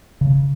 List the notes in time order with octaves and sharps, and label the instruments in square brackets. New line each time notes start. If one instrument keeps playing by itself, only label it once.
[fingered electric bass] C#3